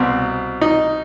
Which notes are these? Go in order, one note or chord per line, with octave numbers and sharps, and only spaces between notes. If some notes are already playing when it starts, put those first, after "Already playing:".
Already playing: C2 B2 C4
D#4